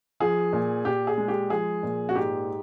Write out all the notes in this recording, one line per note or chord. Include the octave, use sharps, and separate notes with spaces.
F3 G#4
A#2
A#2 G4
G#4
G#3
G4
F3 G#4
A#2
F#4
G#2 G4